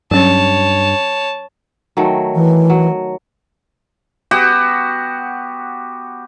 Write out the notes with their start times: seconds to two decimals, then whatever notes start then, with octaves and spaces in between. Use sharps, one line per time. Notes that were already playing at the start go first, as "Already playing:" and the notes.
0.11 G2 F#3 C#4 C#5 A5
1.97 D#3 F#3 A3
2.35 E3
2.70 F#3
4.31 B3 F#4 G4 F#5